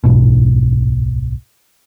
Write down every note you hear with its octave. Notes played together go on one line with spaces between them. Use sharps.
D1 B1 G#2 B2